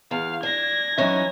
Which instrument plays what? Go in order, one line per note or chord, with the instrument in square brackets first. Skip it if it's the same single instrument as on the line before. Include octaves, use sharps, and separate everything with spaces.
[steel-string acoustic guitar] E2 [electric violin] F5
[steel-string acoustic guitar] D4 [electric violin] G#6 A#6
[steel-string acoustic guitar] E3 C#4 D#4 [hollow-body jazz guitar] F#3 E5